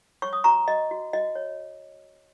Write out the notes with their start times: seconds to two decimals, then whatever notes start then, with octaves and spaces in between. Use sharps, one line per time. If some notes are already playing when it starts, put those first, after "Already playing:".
0.22 C#5 C#6
0.33 D#6
0.44 F#4 A#5 C#6
0.67 F#4 D#5
0.91 F#4
1.13 F#4 D#5
1.35 C#5